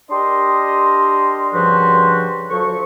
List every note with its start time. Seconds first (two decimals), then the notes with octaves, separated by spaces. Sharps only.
0.10 D4 G4 A#4 D#5 C6
1.53 G2 C#3 F3 F#4 G4 C6
2.51 D2 F3 F#3 C#6